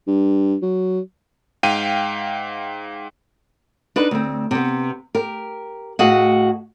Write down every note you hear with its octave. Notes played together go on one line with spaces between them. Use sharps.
G2
F#3
G#2 F5 G5 D#7
D4 D#4 B4
D2 C4
C3 B3
G4 A#4
A2 F#4 G#4 D#5 F5 F#5